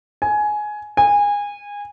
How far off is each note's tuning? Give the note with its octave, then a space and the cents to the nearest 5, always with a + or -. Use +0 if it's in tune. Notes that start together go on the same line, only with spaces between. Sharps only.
G#5 +15
G#5 -25